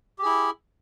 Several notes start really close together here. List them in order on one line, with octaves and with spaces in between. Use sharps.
G4 G#4 E4